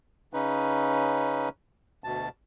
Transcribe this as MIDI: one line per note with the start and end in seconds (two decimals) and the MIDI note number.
0.34 1.49 49
0.34 1.49 61
0.34 1.49 63
0.34 1.49 71
2.04 2.29 38
2.04 2.29 47
2.04 2.29 81